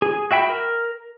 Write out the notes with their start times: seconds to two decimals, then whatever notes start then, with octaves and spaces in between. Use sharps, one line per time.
0.02 G#4
0.31 F#4 E5 G5 B5
0.49 A#4